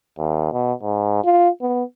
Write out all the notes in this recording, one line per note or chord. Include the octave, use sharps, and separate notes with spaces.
D#2
B2
G#2
F4
B3